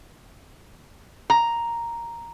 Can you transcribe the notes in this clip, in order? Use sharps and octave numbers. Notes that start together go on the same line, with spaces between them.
A#5